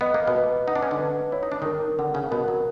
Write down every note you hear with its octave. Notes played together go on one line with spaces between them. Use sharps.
B3 D#5
A#3
B2 B3
B4
D#4 F#5
D4
C#4
D3 D4
B4
E4 C#5
D#4
D4
D#3 D#4 A#4
D3 D4 F#5
C#3 C#4
B2 B3 A#4
F#3